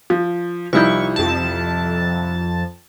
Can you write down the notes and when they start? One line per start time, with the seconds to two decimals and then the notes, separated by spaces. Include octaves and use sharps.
0.10 F3
0.73 C2 F3 G3 D#4 E4 C#6 G6
1.16 F2 A5